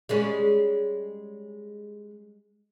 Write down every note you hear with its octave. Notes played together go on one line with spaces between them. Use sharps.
G3 G#3 C#4